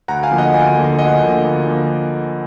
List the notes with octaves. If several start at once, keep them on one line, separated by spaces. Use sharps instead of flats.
D2 F#5 A#5
F5 G#5
D3 F3 A#3
D#5 F#5
D2 F5 G#5
D3 F3 A#3
D2 D#5 F#5
D3 F3 A#3
D2
D3 F3 A#3